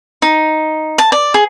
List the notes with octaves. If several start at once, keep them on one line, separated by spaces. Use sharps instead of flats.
D#4
A5
D5
G#4